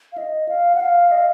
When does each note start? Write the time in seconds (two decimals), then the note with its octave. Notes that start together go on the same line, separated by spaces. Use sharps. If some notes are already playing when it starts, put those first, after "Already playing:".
0.12 F5
0.18 D#5
0.49 F5
0.75 F#5
0.80 F5
1.11 D#5
1.18 F5